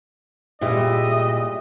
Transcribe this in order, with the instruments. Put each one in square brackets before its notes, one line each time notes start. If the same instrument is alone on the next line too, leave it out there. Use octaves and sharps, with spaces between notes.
[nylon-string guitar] A#2 [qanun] G3 G#3 E4 [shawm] D#5 [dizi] E5